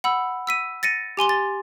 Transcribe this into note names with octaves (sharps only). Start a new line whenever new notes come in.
F#5 B5 E6
E6 B6 D#7
A6 A#6 C#7 D#7
G4 G#5 C6 G7
A6